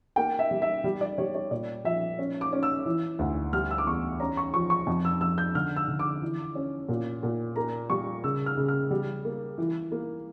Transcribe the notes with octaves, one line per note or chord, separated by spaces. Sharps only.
A#3 G5
E5
G3
E5
G3
D5
G3 C#5
C#5
A#2 D5
F3 E5
C#4
D6
C#4
E6
E3
D2
G3 F6
E6
D6
E2 C#6
C#4 A#5
C#6
F3 C#6
C#6
F2
E6
F2 E6
G6
D3 F6
E6
D3
D6
E3
C#4
A#2
A#2
A#3 A#5
G3 C#6
C#3 E6
F6
C#3
F6
G3
A#3
E3
A#3